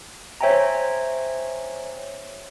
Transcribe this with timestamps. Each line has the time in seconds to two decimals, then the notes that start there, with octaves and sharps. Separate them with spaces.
0.41 C5 C#5 E5 G5 G#5 A#5